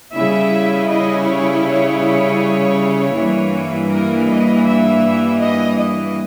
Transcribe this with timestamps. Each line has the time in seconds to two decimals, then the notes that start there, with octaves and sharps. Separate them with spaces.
0.13 C#3 G3 C#4 E4 E5
0.89 D#5
1.26 C#5
1.64 C#5
3.14 G2 E3 A#3
3.89 A#4
4.26 D#5
4.65 E5
5.39 D#5
5.77 D#5